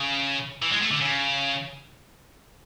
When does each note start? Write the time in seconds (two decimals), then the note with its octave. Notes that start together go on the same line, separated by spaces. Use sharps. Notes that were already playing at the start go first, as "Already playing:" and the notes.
Already playing: C#3
0.62 E3
0.71 G#3
0.82 A3
0.91 D3
1.01 C#3